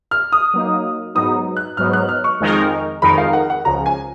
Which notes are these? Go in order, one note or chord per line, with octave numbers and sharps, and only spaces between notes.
F6
D#6
F#3 A#3 D#4
G#2 F#3 B3 D#4 D#6
F#6
G#2 F#3 B3 D#4 F6
F#6
F6
C#6
F2 D#3 G#3 D#4 A#4
F2 D#3 G#3 D#4 A#4 B5
F5
F#5
F#5
C#2 C#3 F3 A#5
G#5